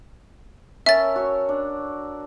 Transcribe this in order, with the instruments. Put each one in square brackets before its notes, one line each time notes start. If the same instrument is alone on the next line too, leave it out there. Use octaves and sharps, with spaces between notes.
[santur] C#4 A4 A#4 [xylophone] E5 A6
[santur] F#4 C#5 E6
D4